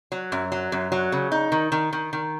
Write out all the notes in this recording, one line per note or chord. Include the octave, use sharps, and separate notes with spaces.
F#3
F#2
F#3
F#2
F#3
C#3
D#4
D#3
D#3
D#3
D#3